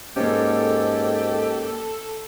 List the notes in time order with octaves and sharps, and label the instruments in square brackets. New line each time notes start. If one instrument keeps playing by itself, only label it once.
[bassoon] G#2 [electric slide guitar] A#3 C#4 [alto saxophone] G4 [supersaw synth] A4